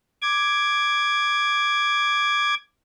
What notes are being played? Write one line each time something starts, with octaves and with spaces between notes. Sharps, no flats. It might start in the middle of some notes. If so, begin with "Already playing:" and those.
D6 G#6